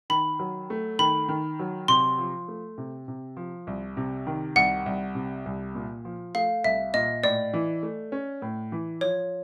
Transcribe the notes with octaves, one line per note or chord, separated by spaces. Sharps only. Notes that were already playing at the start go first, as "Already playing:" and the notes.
D#3 B5
F#3
A3
D#3 B5
D#3
F#3
C3 C6
F3
A3
C3
C3
F3
C2
C3
D#3
C2 F#5
C2
C3
C2
A#2
F3
A3 F5
C2 E5
A#2 D#5
A2 D5
E3
A3
C#4
A2
E3
F3 C#5